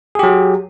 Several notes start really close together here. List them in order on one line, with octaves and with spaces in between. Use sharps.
G#4 G4 F#3